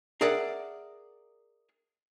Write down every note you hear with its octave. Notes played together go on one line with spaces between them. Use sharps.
G#4 A#4 D5 E5 F#5 G5